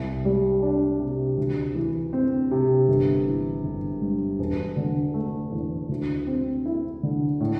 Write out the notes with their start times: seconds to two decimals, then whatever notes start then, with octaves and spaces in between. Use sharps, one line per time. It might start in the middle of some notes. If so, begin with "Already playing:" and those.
Already playing: C2
0.25 G3
0.62 D4
1.00 C3
1.38 D2
1.75 E3
2.13 C4
2.51 C3
2.88 G1
3.26 E3
3.64 G1
4.02 G2
4.39 E1
4.77 D3
5.14 A3
5.52 E2
5.89 D2
6.27 C4
6.66 E4
7.03 D3
7.40 A2